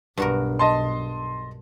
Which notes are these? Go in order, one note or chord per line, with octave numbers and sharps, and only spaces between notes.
B1 G2 F#4 A#4
D#5 A5 C6